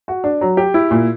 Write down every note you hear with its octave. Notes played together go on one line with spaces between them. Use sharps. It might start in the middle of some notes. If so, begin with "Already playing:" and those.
F#4
D4
F#3
G4
E4
A#2